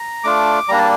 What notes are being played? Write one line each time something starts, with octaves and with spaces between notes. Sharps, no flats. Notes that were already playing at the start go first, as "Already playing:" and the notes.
Already playing: A#5
A3 D4 F4 D6
G3 A#3 D4 A#5
A5